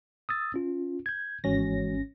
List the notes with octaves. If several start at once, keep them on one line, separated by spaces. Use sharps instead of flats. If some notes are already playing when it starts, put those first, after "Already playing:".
D#6 E6 A6
C#4 F4
G6 G#6
G#1 E3 G#3 C#4 F#4 A#6